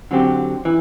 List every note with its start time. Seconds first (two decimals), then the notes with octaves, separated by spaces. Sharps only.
0.11 D3 F#3 C4 G4
0.65 E3